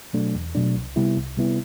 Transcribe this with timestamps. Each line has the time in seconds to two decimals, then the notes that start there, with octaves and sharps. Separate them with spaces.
0.13 B2 F#3 A3 D4
0.35 E2
0.55 B2 F#3 A3 D4
0.76 C2
0.96 C3 G3 B3 E4
1.17 C2
1.37 C3 G3 B3 E4